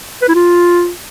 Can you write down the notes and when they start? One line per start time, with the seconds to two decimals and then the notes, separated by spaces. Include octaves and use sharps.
0.22 B4
0.28 E4
0.35 F4